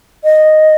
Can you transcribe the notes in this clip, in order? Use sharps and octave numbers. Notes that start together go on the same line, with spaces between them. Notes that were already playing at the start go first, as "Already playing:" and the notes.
D#5